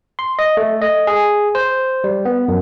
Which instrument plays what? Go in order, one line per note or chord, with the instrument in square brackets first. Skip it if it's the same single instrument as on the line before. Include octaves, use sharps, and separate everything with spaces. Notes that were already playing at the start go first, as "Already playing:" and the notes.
[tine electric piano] C6
D#5
A3
D#5
G#4
C5
G3
B3
F#2